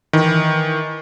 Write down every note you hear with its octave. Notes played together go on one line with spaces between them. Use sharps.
D#3 E3